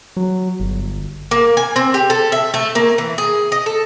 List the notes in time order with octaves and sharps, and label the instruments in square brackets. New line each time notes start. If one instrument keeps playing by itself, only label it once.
[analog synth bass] F#3
G1
[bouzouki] A#3
G#5
C4
G4
A4
E5
A3
A#3
E3
G#4
D#5
A4